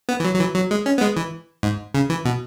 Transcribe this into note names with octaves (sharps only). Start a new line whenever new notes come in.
B3
E3
F#3
F#3
E3
F#3
G#3
C#4
B3
G#3
E3
G#2
C#3
E3
B2